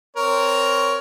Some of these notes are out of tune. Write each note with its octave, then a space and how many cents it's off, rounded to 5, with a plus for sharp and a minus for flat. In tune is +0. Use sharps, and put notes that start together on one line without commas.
C4 +0 A#4 +0 C#5 +10